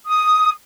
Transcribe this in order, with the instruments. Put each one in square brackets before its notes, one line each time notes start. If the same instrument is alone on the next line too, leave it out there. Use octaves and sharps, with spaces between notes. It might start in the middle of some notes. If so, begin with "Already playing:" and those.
[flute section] D#6